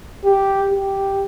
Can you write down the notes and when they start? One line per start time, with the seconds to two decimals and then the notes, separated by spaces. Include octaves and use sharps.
0.24 G4
0.70 G4